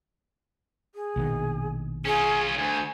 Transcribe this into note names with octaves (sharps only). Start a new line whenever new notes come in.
G#4
A#1 B2 D#3
C#4 F4 G#4
D2 G#5